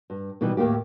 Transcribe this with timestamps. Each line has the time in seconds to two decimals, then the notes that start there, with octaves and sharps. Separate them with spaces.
0.10 G2
0.41 B2 D#3 E3 G3
0.57 D#2 A2 A#3 G4